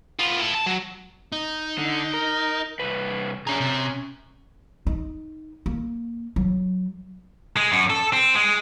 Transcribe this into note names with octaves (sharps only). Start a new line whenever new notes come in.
B3 F4
E4 A4
A5
F#3
D#4
D3
A#4
C2 B4
C#4 D4 G#4 A#5
C3
D#4
A#3
F#3
G#3
F#2
A4
C4
G#3